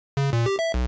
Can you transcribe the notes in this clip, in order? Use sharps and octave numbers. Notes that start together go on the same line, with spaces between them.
C#3
A#2
G4
E5
B1